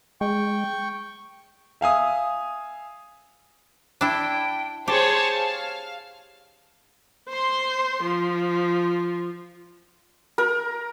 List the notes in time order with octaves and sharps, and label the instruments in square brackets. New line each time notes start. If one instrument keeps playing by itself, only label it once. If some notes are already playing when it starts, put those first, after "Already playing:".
[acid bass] G#3 [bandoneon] G5 C#6
[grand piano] E5 F5 G#5 D#6
[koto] D4 E4 [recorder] G5
[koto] G4 [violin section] G#4 C5 C#5 [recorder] A5
[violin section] F5
[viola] C5 C6
F3
[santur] A#4